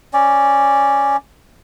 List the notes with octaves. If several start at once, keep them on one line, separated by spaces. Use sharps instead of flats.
C#4 D5